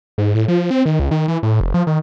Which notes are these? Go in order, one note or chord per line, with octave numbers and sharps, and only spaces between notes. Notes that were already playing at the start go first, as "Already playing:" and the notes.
G#2
A2
F3
C4
D#3
C#2
D#3
E3
A2
F1
F3
D#3